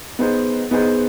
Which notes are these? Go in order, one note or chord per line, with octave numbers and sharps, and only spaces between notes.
B3 D#4 G#4 C5
B3 D#4 G#4 C5